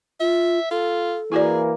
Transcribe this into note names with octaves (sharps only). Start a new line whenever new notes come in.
F4 E5
F4 A4
E3 A#3 E4 F#4 G#4 D5